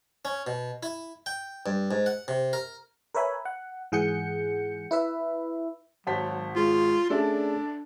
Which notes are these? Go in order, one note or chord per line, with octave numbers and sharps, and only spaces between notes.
C#4
B2
E4
G5
G2
G#2
F#5
C3
A#4
A#4 B4 C#5 E5 G#5 B5
F#5
G#2 E3 G#4 F#5 G6 C#7
E4 B4 E5
G#1 F#3 C5 F#5 A5 B6
G#3 F4 G#4
A3 C#4 D4 G#4 A4 D5 E5